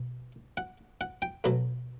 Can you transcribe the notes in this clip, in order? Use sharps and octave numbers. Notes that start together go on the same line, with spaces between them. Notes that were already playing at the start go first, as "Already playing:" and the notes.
Already playing: B2
F#5
F#5
G5
B2 F#3 A3